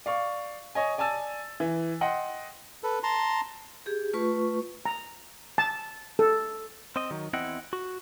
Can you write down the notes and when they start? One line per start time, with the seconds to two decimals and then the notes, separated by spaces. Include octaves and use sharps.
0.06 D5 F5 C#6
0.75 C#5 D#5 G#5
0.98 D5 G#5 A5 E6 A6
1.60 E3
2.01 D#5 F#5 G5 C6
2.83 A4 B4
3.03 A5 A#5 C6
3.86 G4 G#4
4.13 A3 F4 B4 C#6
4.86 A#5
5.58 A5
6.19 A4
6.96 C4 D#5
7.11 D#3 F#3
7.33 E2 C4 E4 D#5 F#5 G5
7.73 F#4